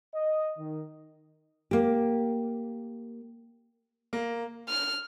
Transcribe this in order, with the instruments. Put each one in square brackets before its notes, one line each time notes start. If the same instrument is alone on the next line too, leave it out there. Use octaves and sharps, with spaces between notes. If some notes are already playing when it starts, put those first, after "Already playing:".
[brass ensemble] D#5
D#3
[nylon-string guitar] A#3 G4
[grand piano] A#3
[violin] F6